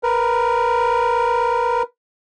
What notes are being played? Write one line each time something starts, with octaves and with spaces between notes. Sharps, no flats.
A#4 B4